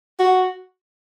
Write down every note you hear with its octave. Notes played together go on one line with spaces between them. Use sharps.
F#4